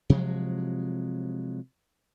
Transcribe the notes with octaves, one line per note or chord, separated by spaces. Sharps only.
C3 F3 F#3 G#3